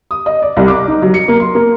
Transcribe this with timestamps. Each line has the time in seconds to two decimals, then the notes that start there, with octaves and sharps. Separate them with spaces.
0.11 D#6
0.26 D#5
0.42 D5
0.57 C2
0.68 D6
0.88 D#4
1.02 F#3
1.14 C#7
1.28 A#3
1.40 C6
1.55 A#3